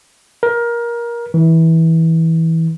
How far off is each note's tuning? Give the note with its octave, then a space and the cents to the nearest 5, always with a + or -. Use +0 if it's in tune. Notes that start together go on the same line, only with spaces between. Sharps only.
A#4 +20
E3 -20